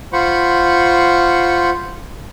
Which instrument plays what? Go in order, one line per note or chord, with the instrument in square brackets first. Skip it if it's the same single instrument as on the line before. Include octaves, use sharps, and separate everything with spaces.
[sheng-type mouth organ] F4 C5 F#5 B5 C#6